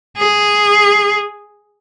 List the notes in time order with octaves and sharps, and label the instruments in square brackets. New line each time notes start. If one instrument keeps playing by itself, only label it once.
[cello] G#4